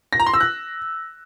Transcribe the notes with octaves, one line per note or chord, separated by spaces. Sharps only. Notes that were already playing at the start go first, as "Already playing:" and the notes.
A#6
A#5
C6
E6
F#6